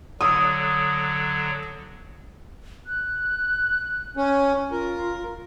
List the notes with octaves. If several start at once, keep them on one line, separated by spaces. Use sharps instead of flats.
D3 F#3 D#6 E6
F#6
C#4
F4 A#4